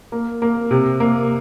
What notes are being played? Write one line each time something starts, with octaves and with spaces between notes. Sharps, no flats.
A#3
A#3
C3
A#3